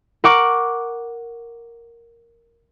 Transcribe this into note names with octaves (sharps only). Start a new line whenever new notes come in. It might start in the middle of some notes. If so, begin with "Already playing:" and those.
A#4 F#5 C#6 D6 F#6 C#7